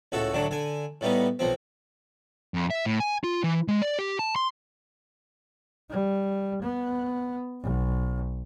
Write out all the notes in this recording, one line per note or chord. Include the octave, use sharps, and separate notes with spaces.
C#2 A2 F#4 A4
A2 D3 F#3 D4
D3 G#5
A2 G3 B3 D#4
B1 F3 C4
F2
E5
A2
G#5
F4
E3
G#3
D5
G4
A5
C6
G3
B3
B1